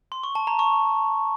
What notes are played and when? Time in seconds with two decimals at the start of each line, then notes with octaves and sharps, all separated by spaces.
0.12 C6
0.24 C#6
0.35 A5
0.47 A#5
0.59 C#6